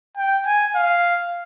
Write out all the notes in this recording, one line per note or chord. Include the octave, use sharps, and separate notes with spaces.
G5
G#5
F5